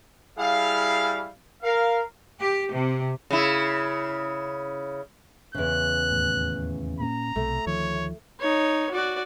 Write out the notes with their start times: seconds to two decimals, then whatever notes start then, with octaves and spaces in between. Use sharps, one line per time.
0.38 G3 E4 G#4 F5
1.63 A#4 F5
2.40 G4
2.74 C3
3.30 C#3 E4
5.54 E2 C#3 F#6
6.11 D#2 A2
7.00 A#2 A#3 C#4 A#5
7.36 B1 C3 A3
7.66 D2 D#3 F3 C#5
8.40 D#4 C#5
8.91 F#4 D5